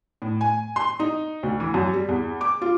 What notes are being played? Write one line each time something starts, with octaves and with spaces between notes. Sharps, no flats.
A2
G#5
C6
D#4
D2
E3
F#2
G3
E2
D6
F4